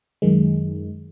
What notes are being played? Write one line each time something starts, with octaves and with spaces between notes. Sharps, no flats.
F#2 D#3 G#3